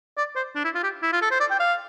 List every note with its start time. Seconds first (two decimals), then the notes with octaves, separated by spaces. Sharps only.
0.17 D5
0.36 C5
0.55 D4
0.64 E4
0.75 F4
0.84 G4
1.03 E4
1.13 F4
1.22 A4
1.31 C5
1.40 D5
1.51 G5
1.60 F5